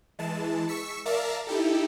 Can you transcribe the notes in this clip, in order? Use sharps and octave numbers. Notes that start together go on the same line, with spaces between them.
E3 G#3 A5
C#6 E6 B6 C#7
A#4 D5 E5 F5 A5 A#5
D#4 E4 G4 A4